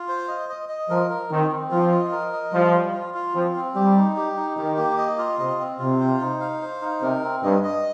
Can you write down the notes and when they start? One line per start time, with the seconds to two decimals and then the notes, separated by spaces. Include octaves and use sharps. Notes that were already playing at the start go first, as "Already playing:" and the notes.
Already playing: F4
0.08 C5
0.28 D#5
0.49 D#5
0.69 D#5
0.90 F3 A#4
1.10 A#4
1.31 D#3 C4
1.51 C4
1.71 F3 F4
1.91 D#5
2.12 A#4
2.33 D#5
2.53 F3 G3
2.74 G3
2.93 F4
3.14 F4
3.35 F3 C4
3.56 C4
3.75 G3 G4
3.96 D#4
4.16 G4
4.37 D#4
4.57 D#3 G4
4.78 A#3
4.98 D#5
5.18 F4
5.39 C3 D#5
5.60 C4
5.79 C3 F4
6.00 C5
6.21 D#4
6.40 F5
6.62 C5
6.82 D#4
7.02 C3 A#4
7.23 C4
7.43 G2 D#5
7.64 D#5